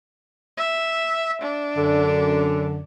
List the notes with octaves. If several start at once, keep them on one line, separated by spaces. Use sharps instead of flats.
E5
D4
F#2 D3